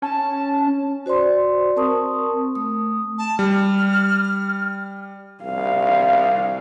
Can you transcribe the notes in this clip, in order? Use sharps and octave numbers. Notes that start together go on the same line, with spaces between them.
C#4 A5
F#4 C5 D5 C6
C4 A#4 A5 C6 C#6 D#6
A3 D#6
A5
G3 F6
C2 F5